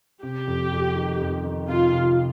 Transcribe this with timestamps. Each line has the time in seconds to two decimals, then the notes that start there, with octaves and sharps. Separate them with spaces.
0.23 C3 G4
0.47 F2
0.72 F2
0.95 D#3
1.20 F2
1.44 D#3
1.68 C3 F4
1.92 C3